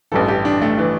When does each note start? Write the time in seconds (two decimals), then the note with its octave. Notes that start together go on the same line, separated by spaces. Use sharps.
0.12 A1 G2 E3 A4
0.28 G4
0.45 D4
0.62 A3
0.78 E3